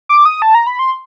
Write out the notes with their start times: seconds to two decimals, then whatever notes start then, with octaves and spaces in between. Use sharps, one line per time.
0.09 D6
0.25 D#6
0.42 A5
0.55 A#5
0.67 B5
0.79 C6